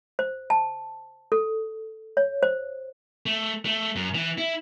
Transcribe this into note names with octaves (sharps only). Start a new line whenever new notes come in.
C5
A5
A4
C#5
C5
A3
A3
F#2
E3
E4